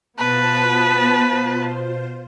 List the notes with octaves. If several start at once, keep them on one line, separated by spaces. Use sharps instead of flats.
B2 B3 F4 B4 C5 A5